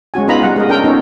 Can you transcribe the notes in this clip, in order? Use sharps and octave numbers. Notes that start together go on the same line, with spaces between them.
G#3 C#4 F#4 G#5
B3 D#4 F4 D#5 A#5 B5
G3 F#5
G#3 A#4 D#5
C#4 D4 A4 A#4 G5
A#3 B3 C#4 D#4 F4 A4